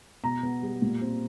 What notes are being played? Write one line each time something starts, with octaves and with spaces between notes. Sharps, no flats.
B2 A#5
B3
G3
A#2
C4